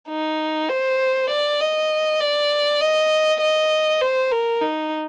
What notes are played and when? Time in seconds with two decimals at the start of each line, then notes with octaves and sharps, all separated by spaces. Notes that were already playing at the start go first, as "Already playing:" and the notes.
0.09 D#4
0.69 C5
1.30 D5
1.60 D#5
2.20 D5
2.81 D#5
3.40 D#5
4.01 C5
4.32 A#4
4.62 D#4